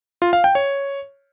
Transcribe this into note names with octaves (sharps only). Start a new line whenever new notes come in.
F4
F5
G5
C#5